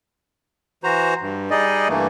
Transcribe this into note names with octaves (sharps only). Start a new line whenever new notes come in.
E3 F#4 C5 A#5
G2
G3 D#4 G#4 D5 D#5
G2 E3 A3 A#3